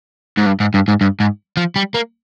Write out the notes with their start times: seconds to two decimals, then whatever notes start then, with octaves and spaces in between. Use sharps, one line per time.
0.37 G#2
0.46 G2
0.60 G#2
0.74 G2
0.88 G#2
1.01 G2
1.20 G#2
1.57 F3
1.76 G3
1.94 A#3